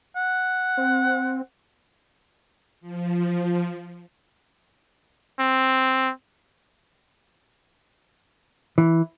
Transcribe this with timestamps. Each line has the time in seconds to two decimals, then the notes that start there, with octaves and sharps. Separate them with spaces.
0.16 F#5
0.77 C4
2.81 F3
5.40 C4
8.78 E3